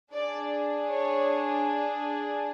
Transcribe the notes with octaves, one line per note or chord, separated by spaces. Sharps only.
D4 G#4 D5
C#5